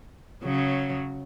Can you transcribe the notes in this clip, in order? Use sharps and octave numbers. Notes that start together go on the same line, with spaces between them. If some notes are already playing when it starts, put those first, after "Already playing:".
C#3 F#3